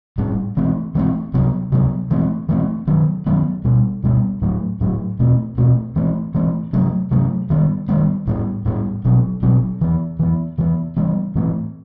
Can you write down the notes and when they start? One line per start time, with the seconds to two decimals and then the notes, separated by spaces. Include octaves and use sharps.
0.18 A2 G3 C4
0.57 E3 A3 C4
0.95 E3 A3 C4
1.34 C3 F#3 B3
1.72 C3 F#3 B3
2.11 E3 A3 C4
2.49 E3 A3 C4
2.87 D#3 F#3 B3
3.26 D#3 F#3 B3
3.65 B2 G3 B3
4.04 B2 G3 B3
4.42 A2 F#3 A3
4.81 A2 F#3 A3
5.19 B2 A3 C4
5.58 B2 A3 C4
5.96 E3 A3 C4
6.34 E3 A3 C4
6.73 C3 F#3 A3
7.11 C3 F#3 A3
7.50 D#3 G3 B3
7.89 D#3 G3 B3
8.27 A2 G3 B3
8.66 A2 G3 B3
9.05 B2 F#3 C4
9.43 B2 F#3 C4
9.81 E3 B3
10.19 E3 B3
10.58 E3 G3
10.63 B3
10.97 E3 G3 B3
11.35 A2 E3 A3 C4